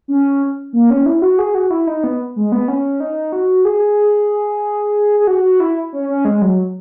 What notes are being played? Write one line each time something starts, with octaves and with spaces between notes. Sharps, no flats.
C#4
A#3
C#4
E4
F#4
G#4
F#4
E4
D#4
B3
G#3
B3
C#4
D#4
F#4
G#4
G#4
F#4
F#4
E4
C#4
C#4
G#3
F#3